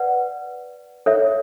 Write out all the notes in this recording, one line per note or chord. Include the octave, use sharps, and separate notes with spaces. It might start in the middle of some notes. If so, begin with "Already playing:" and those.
Already playing: B4 D5 F#5
A4 C#5 E5